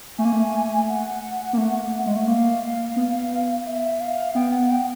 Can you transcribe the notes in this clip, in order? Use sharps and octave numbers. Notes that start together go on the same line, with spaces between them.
A3 G#5
A#3
A3
F#5
A#3
A3
G#3
A3
A#3 F5
B3
E5
F5
B3 G5
F#5
G5